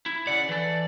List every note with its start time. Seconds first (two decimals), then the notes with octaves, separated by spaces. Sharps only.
0.06 E4
0.27 C#3 D5 F#5
0.49 E3 A4